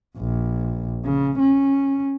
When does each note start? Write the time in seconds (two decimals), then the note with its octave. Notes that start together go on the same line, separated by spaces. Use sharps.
0.17 A#1
1.04 C#3
1.39 C#4